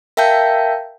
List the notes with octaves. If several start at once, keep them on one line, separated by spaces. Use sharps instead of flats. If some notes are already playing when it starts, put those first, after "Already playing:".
A#4 E5 F5 G5 A5 G6